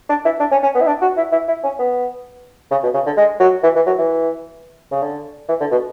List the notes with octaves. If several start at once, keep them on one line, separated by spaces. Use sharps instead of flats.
D4
E4
D4
C#4
C#4
B3
E4
D4
F#4
E4
E4
E4
C#4
B3
C#3
B2
C#3
D3
G#3
F#3
E3
E3
F#3
E3
C#3
D3
E3
D3
B2